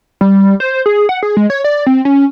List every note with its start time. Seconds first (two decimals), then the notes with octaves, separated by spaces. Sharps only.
0.21 G3
0.60 C5
0.86 G#4
1.09 F#5
1.23 G#4
1.37 G#3
1.50 C#5
1.64 D5
1.86 C4
2.05 C#4